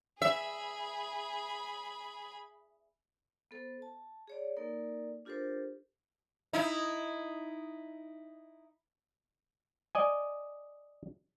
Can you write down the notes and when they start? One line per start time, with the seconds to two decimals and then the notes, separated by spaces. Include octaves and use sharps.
0.22 G#4 E5 B5
3.51 B3 A4 C5
3.82 A5
4.28 G#4 C#5 D5
4.57 A#3 D#4 A4 A#4 D5
5.25 D4 F4 G4 A4 A#4 C5
6.53 D#4 E4
9.95 D5 D#5 G#5